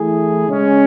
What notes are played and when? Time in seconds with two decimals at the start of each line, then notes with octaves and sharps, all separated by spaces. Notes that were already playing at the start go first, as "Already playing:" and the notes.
Already playing: E3 A3 E4 G#4
0.47 C#3 G#3 C#4